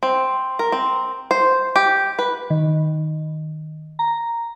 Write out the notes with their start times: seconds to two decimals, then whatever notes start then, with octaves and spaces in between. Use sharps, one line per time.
0.03 C4
0.59 A#4
0.72 C4
1.31 C5
1.76 G4
2.19 B4
2.50 D#3
3.99 A#5